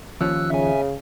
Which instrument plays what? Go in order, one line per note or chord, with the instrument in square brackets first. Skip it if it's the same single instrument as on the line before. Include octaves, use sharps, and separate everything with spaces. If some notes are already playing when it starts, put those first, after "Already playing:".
[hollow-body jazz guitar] D#2 F3 C#4 [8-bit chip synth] E6 F#6
[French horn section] C#3 [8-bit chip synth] E5 G#5